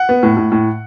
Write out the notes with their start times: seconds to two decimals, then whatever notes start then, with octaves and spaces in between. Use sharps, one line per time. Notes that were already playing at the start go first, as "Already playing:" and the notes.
Already playing: F#5
0.09 B3
0.23 A2
0.37 A2
0.52 A2